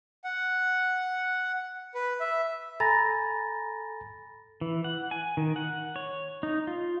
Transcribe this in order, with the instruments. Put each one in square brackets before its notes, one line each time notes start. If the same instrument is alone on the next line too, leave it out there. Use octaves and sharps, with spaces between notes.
[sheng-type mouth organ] F#5
B4
E5
[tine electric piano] A4 G#5 A#5 [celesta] B5 A6 A#6
[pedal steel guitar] E3
F#5
G#5
D#3
F#5
C#5
D#4
F4